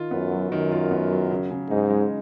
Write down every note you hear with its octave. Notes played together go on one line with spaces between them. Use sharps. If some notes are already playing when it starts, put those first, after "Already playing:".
Already playing: D#3 F4
F#2 B3
F#3
F#2 D#3
F4
B3
F#3
C#3
C#3
G#2 D#4
G#3